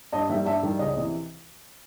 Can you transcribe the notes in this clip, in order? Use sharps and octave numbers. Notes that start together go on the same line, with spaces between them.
G2 D#5
D#3 G3 E5
G2 E5
D#3 G3
C#2 D#5
D#5
C3 E3